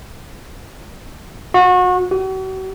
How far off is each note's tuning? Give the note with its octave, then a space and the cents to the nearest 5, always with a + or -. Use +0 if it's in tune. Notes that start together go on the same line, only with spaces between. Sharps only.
F#4 -30
F#4 +40